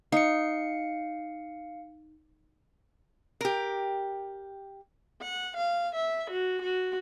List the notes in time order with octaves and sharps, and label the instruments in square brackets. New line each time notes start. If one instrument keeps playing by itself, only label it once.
[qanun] D#4 [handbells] F5 C#7
[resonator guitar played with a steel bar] G4 A#4
[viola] F#5
F5
E5
F#4
F#4